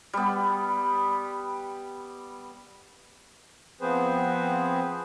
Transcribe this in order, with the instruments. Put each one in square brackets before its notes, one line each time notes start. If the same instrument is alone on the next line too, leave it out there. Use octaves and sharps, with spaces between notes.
[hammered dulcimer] G3 B3
[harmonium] F3 B3 C4 G#4 B4 C5